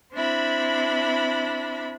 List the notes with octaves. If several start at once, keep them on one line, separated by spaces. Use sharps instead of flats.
C4 D4 E4 B5